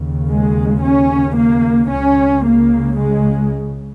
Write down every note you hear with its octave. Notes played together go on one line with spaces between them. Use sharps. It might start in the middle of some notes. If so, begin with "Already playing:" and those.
Already playing: D#2 C#3
G#3
C#4
A#3
C#2 C#3 C#4
A#3
G#3